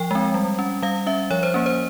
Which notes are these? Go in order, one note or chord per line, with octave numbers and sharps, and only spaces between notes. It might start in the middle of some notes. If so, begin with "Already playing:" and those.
Already playing: F3 G5
G#3 C4
G3
C#4
G3 F5
C#4 E5
F3 C#5
C5
A#3 C#4
C5